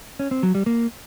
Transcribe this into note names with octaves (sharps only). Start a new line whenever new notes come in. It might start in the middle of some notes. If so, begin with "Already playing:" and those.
C#4
C4
F#3
G3
A#3